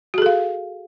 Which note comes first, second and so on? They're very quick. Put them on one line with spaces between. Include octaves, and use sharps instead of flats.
F#4 G#4 A4 F5